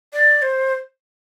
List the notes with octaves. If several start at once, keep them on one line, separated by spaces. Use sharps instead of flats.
D5
C5